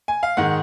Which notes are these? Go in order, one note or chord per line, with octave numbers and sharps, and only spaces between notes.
G#5
F5
G#2 D#3 G#3 F#5